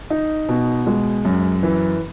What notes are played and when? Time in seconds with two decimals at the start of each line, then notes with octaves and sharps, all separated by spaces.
0.10 D#4
0.49 B2
0.87 G#3
1.25 F#2
1.63 E3